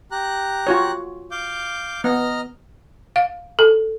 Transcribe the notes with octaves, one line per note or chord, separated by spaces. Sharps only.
G4 A#5 F#6
F4 F#4 C#5
F5 D6 G6
B3 D#5 A#5 F6
F5
A4